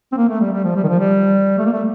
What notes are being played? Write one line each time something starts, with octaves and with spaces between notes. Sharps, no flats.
C4
A#3
A3
G3
G3
F3
G3
D#3
F3
G3
A3
A#3
A3